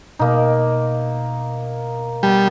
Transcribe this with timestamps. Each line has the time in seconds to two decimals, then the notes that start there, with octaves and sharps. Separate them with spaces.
0.19 B2 A#3 D#4
2.23 G3 B3 F#5 A5